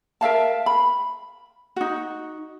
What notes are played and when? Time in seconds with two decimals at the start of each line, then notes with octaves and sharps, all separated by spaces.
0.21 A#4 E5 F5 A5
0.66 B5
1.76 D#4 F#4